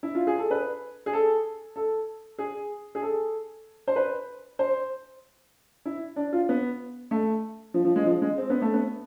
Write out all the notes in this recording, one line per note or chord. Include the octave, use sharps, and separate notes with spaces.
E4
F4
G#4
A4
B4
G#4
A4
A4
G#4
G#4
A4
C5
B4
C5
E4
D4
F4
B3
A3
F3
F3
G#3
F3
G#3
C4
B3
A3
B3